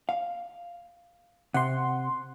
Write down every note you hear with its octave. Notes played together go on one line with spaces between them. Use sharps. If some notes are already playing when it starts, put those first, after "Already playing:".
F5
C3 F#5 C6